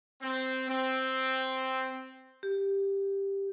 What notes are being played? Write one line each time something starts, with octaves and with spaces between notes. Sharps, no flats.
C4
C4
G4